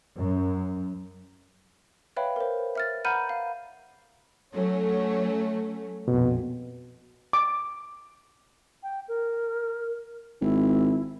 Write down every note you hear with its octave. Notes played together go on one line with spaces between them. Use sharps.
F#2
B4 C#5 E5 F5 G5 B5
A#4 C5
E5 F6 A6
F#5 A#5 B5 F6 G6 D#7
F5
F#3 A3 C#4
A#1 F2 B2
D6
G5
A#4
G#1 E4